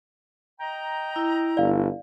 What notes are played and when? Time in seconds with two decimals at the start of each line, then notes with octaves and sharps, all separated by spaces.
0.60 D#5 G5 A#5
1.16 E4
1.57 G1 D5 F5